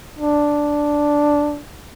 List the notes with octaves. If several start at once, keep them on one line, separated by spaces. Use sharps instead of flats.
D4